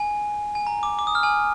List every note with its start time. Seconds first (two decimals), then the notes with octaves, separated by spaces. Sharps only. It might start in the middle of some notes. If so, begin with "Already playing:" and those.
Already playing: G#5
0.55 G#5
0.67 A#5
0.83 D6
0.99 D6
1.07 D#6
1.15 F6
1.23 G#5